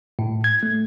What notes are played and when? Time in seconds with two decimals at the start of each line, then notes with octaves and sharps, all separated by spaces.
0.19 A2
0.44 G#6
0.63 A3